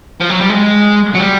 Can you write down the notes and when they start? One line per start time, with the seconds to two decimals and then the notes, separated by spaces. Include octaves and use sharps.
0.20 F3
0.30 F#3
0.41 G3
0.50 G#3
1.14 F#3
1.19 G3